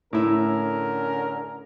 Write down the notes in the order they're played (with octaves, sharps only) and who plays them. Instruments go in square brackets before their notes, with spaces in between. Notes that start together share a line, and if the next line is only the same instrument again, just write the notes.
[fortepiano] A2 E4 [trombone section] D3 C#4 A#4